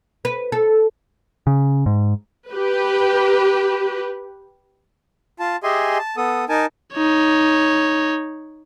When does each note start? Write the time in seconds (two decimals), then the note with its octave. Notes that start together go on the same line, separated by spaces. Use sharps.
0.25 B4
0.52 A4
1.47 C#3
1.86 G#2
2.50 G4 B4
5.39 F4 A5
5.63 G4 G#4 D#5 E5 G#5 C6
5.99 A5
6.17 B3 A4 D#6
6.49 D#4 A#4 G#5 A5
6.95 D#4 C#5